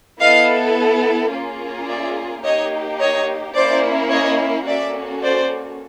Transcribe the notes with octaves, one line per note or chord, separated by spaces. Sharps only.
B3 E4 A4 D#5 F5
A#3 C#4 F4 G#4
D5 E5
A#3 D#4 G4 C#5 D#5
C#5 D#5
A#3 C#4 E4 C5 D5
C#5 D#5
A#3 C#4 F#4 A4 D5 E5
C5 D5